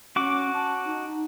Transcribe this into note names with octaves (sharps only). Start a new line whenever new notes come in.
C#4 F#4 D6
A5
D#4